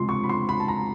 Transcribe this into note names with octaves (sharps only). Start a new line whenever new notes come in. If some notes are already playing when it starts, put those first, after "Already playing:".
Already playing: C#2 C3 F3 G#3 C6
C#6
B5
C6
B5
A5
A#5